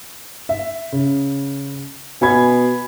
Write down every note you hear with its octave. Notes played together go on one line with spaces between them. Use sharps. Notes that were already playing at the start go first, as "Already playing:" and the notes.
E5
C#3
B2 G#5 B5 G#6